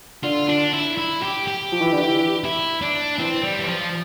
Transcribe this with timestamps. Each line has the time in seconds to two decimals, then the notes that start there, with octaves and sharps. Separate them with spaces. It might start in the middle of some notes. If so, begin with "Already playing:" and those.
0.23 D3 F4
0.48 D4
0.73 E4
0.97 E4
1.22 G4
1.47 G4
1.72 F3
1.81 E3
1.92 D3
2.02 E3
2.45 E4
2.81 D4
3.18 E3 C4
3.44 G3
3.59 E3
3.67 F3